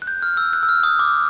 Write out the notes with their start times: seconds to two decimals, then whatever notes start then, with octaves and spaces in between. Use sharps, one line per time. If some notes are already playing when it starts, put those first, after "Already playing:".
0.02 F#6
0.07 G6
0.22 F6
0.37 E6
0.53 F#6
0.63 E6
0.69 F6
0.83 D#6
0.99 D6